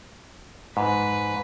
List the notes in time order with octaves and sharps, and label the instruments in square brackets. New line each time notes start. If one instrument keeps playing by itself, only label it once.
[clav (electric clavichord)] G#2 [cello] B4